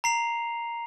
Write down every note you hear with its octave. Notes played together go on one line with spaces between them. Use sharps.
A#5 C7 F7